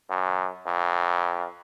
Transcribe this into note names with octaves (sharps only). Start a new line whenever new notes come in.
F#2
F2